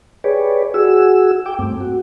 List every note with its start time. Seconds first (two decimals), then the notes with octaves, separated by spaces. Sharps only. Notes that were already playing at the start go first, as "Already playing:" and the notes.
0.24 G4 G#4 B4 C#5 D5
0.74 F#4 G#4 E6
1.46 G5 D6
1.59 G2 A3 C4
1.81 F#4